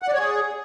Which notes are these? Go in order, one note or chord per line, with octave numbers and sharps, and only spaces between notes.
F#5
D5
C#5
G#4